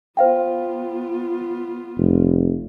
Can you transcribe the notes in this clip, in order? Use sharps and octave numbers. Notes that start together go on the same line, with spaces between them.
B3 F4 C5 F5 G5
F1